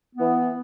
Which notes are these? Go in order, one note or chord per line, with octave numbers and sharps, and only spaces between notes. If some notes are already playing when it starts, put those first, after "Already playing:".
E3 B3